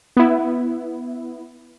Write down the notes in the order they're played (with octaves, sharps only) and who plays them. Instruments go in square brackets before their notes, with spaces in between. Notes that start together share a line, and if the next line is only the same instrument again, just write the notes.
[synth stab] B3 E4